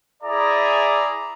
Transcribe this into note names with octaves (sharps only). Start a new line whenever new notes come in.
E4 G#4 D5 E5 A#5